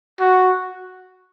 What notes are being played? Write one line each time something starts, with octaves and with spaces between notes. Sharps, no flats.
F#4